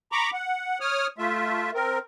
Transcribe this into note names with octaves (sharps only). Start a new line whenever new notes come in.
A#5 B5 C#6 D6
F#5
C#5 D#6 F6
A3 F4 E5
C4 A#4